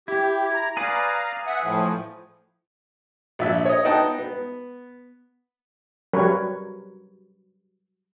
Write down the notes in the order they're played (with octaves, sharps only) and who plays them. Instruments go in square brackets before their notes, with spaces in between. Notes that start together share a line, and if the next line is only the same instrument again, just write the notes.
[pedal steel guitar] E4 [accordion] G4
[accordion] A#5
[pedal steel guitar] G#4 B4 D5 [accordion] F5 A#5
[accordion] E5 F#5
A2 F3
[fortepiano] A#1 E5
C#5 D#5
B3 D#4 D#5 F#5 G5 A5
B3
[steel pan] F#3 G3 C#4 A#4 B4 C#5